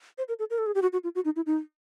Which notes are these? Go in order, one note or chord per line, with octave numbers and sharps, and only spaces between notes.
C5
A#4
A4
A#4
A4
G#4
G4
F#4
F#4
F4
F#4
D#4
E4
D#4